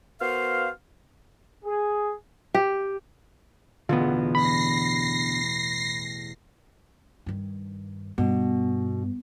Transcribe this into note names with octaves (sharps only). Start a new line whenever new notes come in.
B3 F#4 A#4 C5 F5
G#4
G4
A1 E2 B2 D3 B3 F4
B5 A#6 C7
G2 D#3
G2 B2